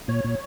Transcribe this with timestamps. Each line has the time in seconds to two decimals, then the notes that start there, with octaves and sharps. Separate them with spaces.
0.08 A#2 C#5
0.24 A#2